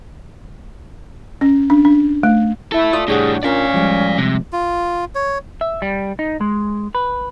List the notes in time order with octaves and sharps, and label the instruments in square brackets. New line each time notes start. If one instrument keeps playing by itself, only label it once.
[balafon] C#4
D4
D4
A3
[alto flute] E4 [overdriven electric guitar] A4 E5
[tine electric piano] F4 D5 D#6
[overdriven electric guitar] A2 G3 [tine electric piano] D4 C#5 F#5 [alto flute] G#4
[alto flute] C#4 [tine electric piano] D4 F4 A#4 [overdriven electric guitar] D5 F5
[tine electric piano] F3 G3 G#3
[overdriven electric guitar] C3
[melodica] F4
C#5
[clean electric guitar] E5
G3
D#4
G#3
B4